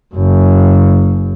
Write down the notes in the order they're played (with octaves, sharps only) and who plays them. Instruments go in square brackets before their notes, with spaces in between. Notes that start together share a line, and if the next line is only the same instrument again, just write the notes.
[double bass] F#1 F#2